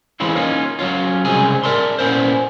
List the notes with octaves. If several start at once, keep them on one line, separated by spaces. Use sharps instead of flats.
E3 G#3 C4 C#4 E4 F4
A#3 C#4 D#4 F4
F#3 C#4 F4
C2 C#3 G#3 C4 G#5
A#4 D5 E5 A5 C6
A#2 B3 C#4 E4 C5